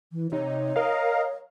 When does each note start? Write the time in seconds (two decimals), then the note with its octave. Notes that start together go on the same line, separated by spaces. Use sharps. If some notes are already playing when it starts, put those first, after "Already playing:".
0.12 E3
0.32 C3 D#4 C#5
0.76 A#4 D#5 F5